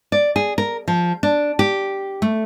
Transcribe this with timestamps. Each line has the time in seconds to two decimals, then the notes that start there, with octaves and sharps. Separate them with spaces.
0.12 D5
0.36 G#4
0.58 A#4
0.88 F3
1.23 D4
1.59 G4
2.22 A3